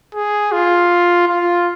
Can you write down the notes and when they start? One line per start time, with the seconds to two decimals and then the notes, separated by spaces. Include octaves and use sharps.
0.14 G#4
0.52 F4
1.28 F4